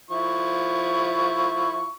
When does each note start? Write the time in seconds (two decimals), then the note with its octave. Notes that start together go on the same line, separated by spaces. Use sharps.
0.10 F3 E4 C#6